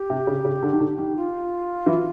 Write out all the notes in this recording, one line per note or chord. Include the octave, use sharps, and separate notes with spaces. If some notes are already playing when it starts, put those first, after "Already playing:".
Already playing: G4
C3
C#3
C#3
D3
D#3
D3
D#3
F4
E3